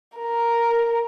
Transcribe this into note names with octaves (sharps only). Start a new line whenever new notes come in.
A#4